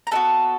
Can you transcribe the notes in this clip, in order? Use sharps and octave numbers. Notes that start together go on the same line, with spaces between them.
A#5
B3 D#4 F#4 A4 A5